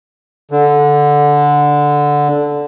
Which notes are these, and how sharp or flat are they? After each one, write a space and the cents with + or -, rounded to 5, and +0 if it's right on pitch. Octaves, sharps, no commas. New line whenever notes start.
D3 -5